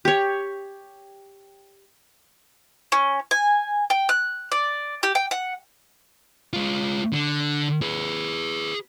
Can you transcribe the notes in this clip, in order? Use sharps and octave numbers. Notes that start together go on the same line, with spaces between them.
G4 C#5
C#4
G#5
G5
F#6
D5
G4
G5
F#5
G#3 F4
D3
G#4 B4